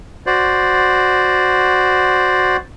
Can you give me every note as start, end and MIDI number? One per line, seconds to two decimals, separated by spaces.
0.26 2.57 66
0.26 2.57 72
0.26 2.57 74